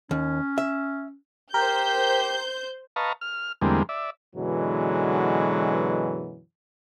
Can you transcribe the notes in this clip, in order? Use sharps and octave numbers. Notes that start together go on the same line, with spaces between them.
D#2 C#4
E5
G4 A#4 C5 G6
B4 D#5 F5 A5 A#5 C#6
F6
E2 D3 G3 G#3 A#3 C4
D5 E5
F#2 B2 D3 E3 F#3 G#3